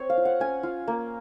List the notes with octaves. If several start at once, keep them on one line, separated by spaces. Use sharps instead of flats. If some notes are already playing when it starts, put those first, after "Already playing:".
Already playing: C4 C#5
F5
F4
F#5
C#4 G#5
F4
A#3